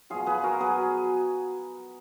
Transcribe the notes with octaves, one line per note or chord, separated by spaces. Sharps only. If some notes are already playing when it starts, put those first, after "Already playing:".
B2 F#3 F4 G#4
G#4 B4
F#4 A#4
B2 F#3 G#4 B4